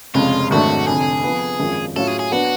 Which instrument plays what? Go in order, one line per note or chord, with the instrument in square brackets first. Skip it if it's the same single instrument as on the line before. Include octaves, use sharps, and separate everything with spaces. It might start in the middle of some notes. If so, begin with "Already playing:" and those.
[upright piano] F1 F2 C#3 G#3 [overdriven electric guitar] F4
[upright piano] G#1 G#2 F#3 A3 D4 [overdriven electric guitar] F#4
[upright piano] F1 F2 D3 [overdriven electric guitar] G#4
[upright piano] F2 F3 B3
G#1 F#2 F3 G#3
[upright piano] A2 F#3 C#4 F4 [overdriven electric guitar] A4
[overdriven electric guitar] G#4
G#4
[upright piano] F#3 B3 D4 [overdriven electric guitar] F#4